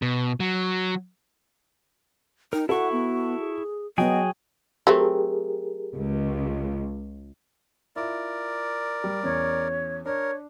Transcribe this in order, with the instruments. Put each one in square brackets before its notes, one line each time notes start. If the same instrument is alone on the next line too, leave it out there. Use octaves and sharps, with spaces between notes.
[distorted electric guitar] B2
F#3
[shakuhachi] D#4 [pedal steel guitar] A#4 [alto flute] G5
[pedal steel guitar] E4 C#6 [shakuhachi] F#4 [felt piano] A4 [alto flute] F#5
[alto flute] B3
G#4
[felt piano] F#3 [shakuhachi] B3 [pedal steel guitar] F#4 G#4 G5 [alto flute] D#5
[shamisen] F#3 A3 C4 [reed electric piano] G4 G#4 A#4
[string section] C#2
[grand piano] E4 F4 [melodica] A#4 D5
[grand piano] G3
[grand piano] E2 C#4 [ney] C#5
[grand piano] D4 [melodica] A#4 [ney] C#5